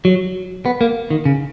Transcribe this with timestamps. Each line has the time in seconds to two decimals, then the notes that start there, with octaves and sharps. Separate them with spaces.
0.05 F#3
0.66 B3
0.81 A#3
1.10 D#3
1.25 C#3